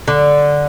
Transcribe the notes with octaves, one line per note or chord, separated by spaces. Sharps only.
D3